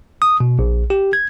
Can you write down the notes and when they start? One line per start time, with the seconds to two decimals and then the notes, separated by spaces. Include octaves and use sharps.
0.22 D#6
0.40 B2
0.59 A#1
0.90 G4
1.13 G#6